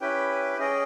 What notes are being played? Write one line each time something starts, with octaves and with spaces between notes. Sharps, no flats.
C#4 E4 G4 B4 G5
C#4 G#4 D#5 G5